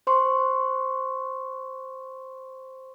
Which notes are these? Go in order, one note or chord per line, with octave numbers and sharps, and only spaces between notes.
C5 C6 C#6